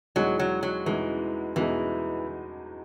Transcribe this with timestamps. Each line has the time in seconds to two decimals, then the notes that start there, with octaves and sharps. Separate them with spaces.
0.16 E2 B2 F#3 G#3 D#4 G#4
0.39 F#3
0.63 F#3
0.86 E2 B2 E3 G#3 D#4 G#4
1.56 E2 B2 E3 G#3 D#4 G#4